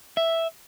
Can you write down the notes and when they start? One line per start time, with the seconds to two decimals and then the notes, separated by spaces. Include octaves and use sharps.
0.17 E5